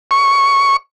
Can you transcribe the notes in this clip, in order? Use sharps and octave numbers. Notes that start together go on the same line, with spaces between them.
C#6